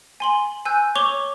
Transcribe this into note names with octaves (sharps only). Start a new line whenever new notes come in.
G#5 C6 F#7
G#5 E6 F#6 G6
C#5 C#6 D6 F7 G7